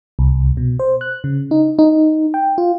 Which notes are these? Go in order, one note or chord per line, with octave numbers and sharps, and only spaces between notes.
C2
B2
C5
F#6
C#3
D#4
D#4
G5
F4